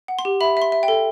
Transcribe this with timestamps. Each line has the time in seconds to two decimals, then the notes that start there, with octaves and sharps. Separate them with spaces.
0.08 F#5
0.19 C6
0.25 G4
0.40 E5 B5
0.57 E5 C6
0.72 E5
0.83 G5
0.88 A4